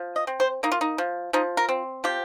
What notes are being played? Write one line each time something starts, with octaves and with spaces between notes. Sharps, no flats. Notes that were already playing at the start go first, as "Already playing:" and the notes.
Already playing: F3
D#5
C4
C5
A#3 D#4
F4
D#4
F3
F3 D#4
A#4
C4
F3 G4